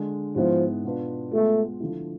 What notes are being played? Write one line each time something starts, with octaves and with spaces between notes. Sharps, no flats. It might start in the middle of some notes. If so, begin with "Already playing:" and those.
Already playing: D3 G#3 D4 G#4
G#2 F3 G#3 B3 E4
B2 B3 D4 F4 B4
G#3 A3 B3 F4
D3 F3 A3 E4